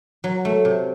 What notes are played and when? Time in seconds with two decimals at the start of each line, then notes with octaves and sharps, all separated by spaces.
0.24 F#3
0.45 A3
0.65 C3